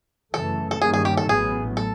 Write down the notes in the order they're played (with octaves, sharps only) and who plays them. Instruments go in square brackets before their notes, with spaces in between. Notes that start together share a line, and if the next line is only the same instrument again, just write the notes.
[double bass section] F#2 C#3 E3 A3 [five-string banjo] A4
[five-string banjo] A4
[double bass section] G2 D#3 G3 A#3 C#4 [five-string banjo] G#4
[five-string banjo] G#4
G4
A4
[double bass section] A1 A2 F#3 B3 [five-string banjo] G#4
[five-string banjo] A4